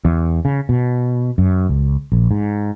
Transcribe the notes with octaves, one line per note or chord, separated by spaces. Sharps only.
E2
C#3
B2
F#2
C#2
A#1
G#2